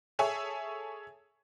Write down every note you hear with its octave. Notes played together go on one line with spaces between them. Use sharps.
G#4 A4 C#5 E5 G#5